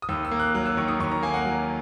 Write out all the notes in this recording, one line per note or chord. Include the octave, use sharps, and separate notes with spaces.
D#6
D#2 E6
E6
A#3
F#6
F#3 F#6
E6
D#3 C#6
D#6
D#2 C#6
A#5
A#3 G#5
F#5
F#3